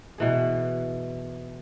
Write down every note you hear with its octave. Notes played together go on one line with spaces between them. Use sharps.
B2 E3 G#4